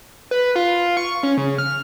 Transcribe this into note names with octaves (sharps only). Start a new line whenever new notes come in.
B4
F4
C#6
C#4
C#3
F6